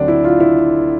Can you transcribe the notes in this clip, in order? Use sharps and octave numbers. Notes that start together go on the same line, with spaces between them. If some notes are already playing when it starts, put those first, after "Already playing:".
Already playing: D2 D3 F#3 A3 C4 D4
E4
F4
E4